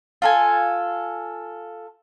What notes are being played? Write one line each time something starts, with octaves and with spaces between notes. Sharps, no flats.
F4 A4 G#5